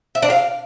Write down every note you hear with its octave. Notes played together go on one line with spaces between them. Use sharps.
E5
D4
F5